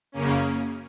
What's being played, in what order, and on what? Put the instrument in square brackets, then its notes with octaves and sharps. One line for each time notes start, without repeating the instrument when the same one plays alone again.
[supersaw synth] F#2 C#3 A#3 C#4